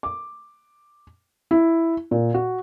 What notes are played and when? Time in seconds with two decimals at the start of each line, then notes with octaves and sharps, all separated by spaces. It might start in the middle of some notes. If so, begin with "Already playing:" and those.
0.03 D6
1.51 E4
2.11 A#2
2.34 F#4